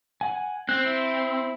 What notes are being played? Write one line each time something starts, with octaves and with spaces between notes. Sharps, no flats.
F#5 G#5
C4 F#6
E4